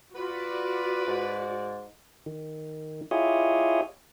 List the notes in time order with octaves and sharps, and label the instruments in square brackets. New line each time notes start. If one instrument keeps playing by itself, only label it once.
[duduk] F4 [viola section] F#4 D5 [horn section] B4
[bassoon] G#2
[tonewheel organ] D#3
E4 F4 G4 G#4 C#5 D#5